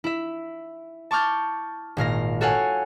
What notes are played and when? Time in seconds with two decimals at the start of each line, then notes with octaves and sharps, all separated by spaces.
0.04 E4 E5
1.11 A5 C#6 D6 F6 G6 A6
1.97 G#1 A#2 F5 A#6
2.41 F#4 A4 C#5 F5 F#5 G#5